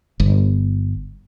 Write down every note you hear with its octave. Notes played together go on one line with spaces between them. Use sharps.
G1